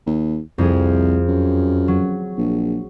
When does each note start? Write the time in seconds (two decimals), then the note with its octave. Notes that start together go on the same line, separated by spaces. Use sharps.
0.06 D#2
0.58 C2 F2 G#4
1.28 F#2
1.88 F#3
2.37 A#1